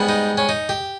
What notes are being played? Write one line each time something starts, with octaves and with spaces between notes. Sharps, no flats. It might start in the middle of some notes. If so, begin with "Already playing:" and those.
Already playing: G#2 G3 B3
D#4
C#4
D#4
G4